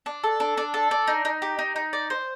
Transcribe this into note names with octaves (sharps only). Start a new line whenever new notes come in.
D4
A4
D4
D4
A4
D4
D#4
D#4
G4
D#4
D#4
D5
C5